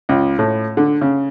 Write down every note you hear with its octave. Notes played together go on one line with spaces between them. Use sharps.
C#2
A2
D3
C#3